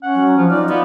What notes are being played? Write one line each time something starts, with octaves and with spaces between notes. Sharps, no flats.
C#4 F#5
F#3
F3 F4
D#4 F4 D5
B3 F5